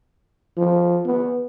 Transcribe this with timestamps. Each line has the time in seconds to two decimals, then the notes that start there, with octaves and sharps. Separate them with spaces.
0.57 F3
1.05 B3